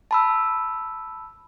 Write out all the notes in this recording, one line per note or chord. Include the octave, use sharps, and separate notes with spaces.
A5 B5 E6